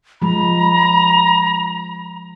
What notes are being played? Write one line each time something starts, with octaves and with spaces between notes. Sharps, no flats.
F3 G#3 A#5 B5